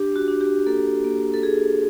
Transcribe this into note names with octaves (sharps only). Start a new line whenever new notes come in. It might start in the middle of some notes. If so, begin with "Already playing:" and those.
Already playing: D4 G4
F#4
D4
G4
A#3 A4
A#3
A4
A#3 G#4